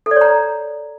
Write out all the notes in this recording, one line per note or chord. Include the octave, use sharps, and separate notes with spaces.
A4
D5
C#5
A#5